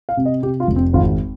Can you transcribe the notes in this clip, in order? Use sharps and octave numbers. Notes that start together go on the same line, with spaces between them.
F5
C3
D#5
C3 G4
F4
F1
C4
G#1 F4